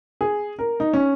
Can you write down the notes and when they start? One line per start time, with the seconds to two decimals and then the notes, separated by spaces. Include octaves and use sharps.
0.21 G#4
0.59 A#4
0.80 D#4
0.93 C#4